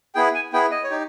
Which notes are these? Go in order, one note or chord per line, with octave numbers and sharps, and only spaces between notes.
B3 E4 G#4 G5
G#5
B3 E4 G#4 G5
D#5
C#5
D#4 G4